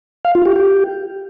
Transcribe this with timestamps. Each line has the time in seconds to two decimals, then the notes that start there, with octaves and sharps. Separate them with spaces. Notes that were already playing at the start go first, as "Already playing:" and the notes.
0.25 F5
0.35 F4
0.45 G4
0.56 G4